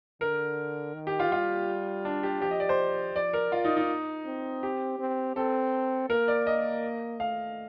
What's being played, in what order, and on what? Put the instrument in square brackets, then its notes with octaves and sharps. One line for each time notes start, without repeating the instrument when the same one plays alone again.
[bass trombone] D3 [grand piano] A#4
[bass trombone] D#3
[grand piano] G4
F4
[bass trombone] G3 [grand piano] F4
[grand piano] D4
G4
[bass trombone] F3 [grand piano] G4
[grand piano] D#5
D5
C5
[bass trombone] F3 [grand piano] D5
[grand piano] A#4
F4
D#4
D#4
[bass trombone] C4
[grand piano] G4
[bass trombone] C4
[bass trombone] C4 [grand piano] A4
[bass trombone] A#3 [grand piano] A#4
[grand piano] D5
D#5
[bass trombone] A3 [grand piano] F5